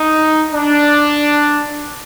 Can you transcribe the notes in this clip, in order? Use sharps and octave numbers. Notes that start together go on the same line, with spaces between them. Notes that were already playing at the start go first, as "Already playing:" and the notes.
Already playing: D#4
D4